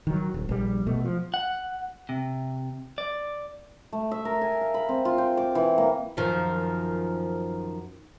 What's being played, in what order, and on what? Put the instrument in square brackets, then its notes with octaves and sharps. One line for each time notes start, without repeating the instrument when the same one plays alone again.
[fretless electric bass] D#3 F#3
D1
A#1 G3
B2 A3
F3
[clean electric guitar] F#5
C3
D5
[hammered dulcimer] A3
E5
A#4
G#5
F5
B5
C4
F4
G5
D6
E3
A#3
[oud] F#2 D#3 F3